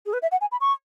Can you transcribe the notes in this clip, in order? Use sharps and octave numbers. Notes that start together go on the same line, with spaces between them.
G#4
B4
E5
F#5
G#5
B5
C#6